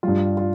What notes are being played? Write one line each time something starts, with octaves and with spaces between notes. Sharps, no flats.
G2 G3 F4
F4